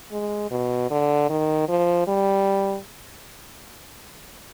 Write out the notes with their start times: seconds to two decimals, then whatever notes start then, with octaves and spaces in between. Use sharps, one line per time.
0.12 G#3
0.51 B2
0.90 D3
1.29 D#3
1.68 F3
2.07 G3